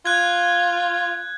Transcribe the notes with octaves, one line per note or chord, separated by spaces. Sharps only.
F4 F#6 G#6